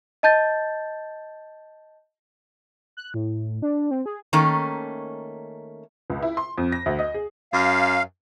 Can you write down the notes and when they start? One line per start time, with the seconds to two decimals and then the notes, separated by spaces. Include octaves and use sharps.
0.23 D#5 A5 G6 A6
2.97 F#6
3.14 A2
3.62 D4
3.91 C4
4.06 G#4
4.33 D#3 A3 A#3 C#4
6.10 C#2
6.22 E4
6.37 C6
6.58 F2
6.72 A#6
6.86 D2
6.99 D#5
7.14 G#4
7.53 F#2 F5